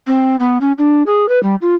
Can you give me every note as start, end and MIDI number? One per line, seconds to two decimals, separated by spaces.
0.07 0.36 60
0.40 0.58 59
0.61 0.72 61
0.78 1.03 62
1.06 1.29 68
1.29 1.41 71
1.43 1.55 55
1.62 1.75 65